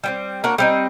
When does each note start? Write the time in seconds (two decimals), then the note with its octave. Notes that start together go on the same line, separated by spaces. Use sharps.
0.04 G3 B3 C4
0.44 A#3 D4 F#4 C#5
0.58 G3 C4 D#4